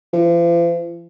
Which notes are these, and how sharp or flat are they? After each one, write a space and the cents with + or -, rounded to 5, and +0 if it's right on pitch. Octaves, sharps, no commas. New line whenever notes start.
F3 -40